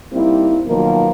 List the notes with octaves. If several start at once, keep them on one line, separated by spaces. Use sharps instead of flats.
G3 A#3 C4 D#4 E4
B2 D#3 F3 F#3 A#3